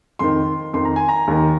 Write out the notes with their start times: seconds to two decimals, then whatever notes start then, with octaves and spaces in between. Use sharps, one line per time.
0.19 F2 D#3 C6
0.73 F2 D#3 C6
0.85 A#5
0.96 G#5
1.08 A#5
1.27 D#2 D#3